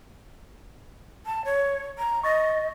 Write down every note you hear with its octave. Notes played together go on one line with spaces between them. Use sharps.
A5
C#5
A#5
D#5 C#6 A6 A#6